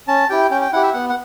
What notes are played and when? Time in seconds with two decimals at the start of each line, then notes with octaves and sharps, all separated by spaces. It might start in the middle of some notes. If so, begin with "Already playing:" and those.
0.08 C#4 A5
0.29 E4 G4 G5
0.51 C#4 G5
0.61 G5
0.73 E4 G4 F#5
0.83 E5
0.93 B3 F#5
1.10 F#5